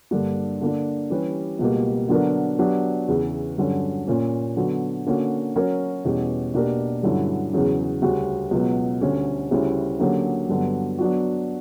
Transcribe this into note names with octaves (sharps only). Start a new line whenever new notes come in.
G2 D3 A#3 D4
D3 A#3 D4
E3 G3 C#4 G4 B4
C#2 B2 G3 A#3
D3 F#3 B3 D4 A#4
F#3 B3 D4 G4
E2 C#3 E3
G2 D3 F#3 C#4
A#2 A#3 C#4
D3 F#3 B3 F#4
D3 A#3 C#4 F#4
F#3 C#4 F#4 A#4 C#5
E2 B2 G3 C#4 G4
B2 A#3 D4 G4 A#4
G2 D3 F#3 C#4 E4
E2 C#3 F#3 C#4
D2 C#3 G3 C#4 F#4
C#2 B2 F#3 B3
D2 D3 G3 C#4
D2 C#3 G3 C#4 E4
D3 F#3 A#3 C#4 G4
G2 D3 F#3 B3
F#3 B3 D4 F#4